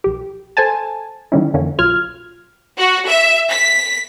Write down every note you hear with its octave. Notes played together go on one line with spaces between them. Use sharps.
B1 G4
A4 C5 G#5 A5
D3 D#3 F#3 G3 C#4 E4
F2 D3 E3 A#3 C#4
B1 F#3 F4 F6 G#6
F#4
E5
B6